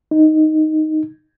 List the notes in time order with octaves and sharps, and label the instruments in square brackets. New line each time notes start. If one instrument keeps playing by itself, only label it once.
[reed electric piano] D#4